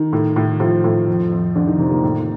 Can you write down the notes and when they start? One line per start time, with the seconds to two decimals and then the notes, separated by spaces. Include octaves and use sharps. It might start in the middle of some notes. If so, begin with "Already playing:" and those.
Already playing: D#3 D#4
0.13 A2
0.36 A2
0.60 A2 F3 F4
0.84 A2
1.08 F2
1.32 F2
1.55 F2 D3 D4
1.67 D#3 D#4
1.79 C3 D#3 C4
1.91 A#3
2.03 A2